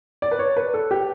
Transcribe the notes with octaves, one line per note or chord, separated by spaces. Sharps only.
D5
B4
C#5
B4
A4
G4